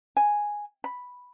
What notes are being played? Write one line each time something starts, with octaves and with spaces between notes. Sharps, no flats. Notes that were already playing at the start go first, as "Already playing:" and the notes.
G#5
B5